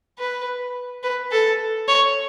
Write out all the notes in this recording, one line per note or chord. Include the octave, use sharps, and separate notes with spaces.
B4
B4
A4
C#5